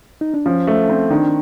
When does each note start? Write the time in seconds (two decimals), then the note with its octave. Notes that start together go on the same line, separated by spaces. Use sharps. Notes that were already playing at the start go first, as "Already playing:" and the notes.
0.21 D#4
0.34 D4
0.46 F3 C#4
0.67 A3
0.89 C4
1.10 D#3 D4